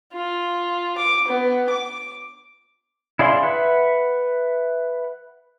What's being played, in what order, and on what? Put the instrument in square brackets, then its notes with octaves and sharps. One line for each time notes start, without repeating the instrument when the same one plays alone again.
[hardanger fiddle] F4
D6
B3
D6
[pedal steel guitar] E4 G#4 D5 F5 C6
B4 E5 F#5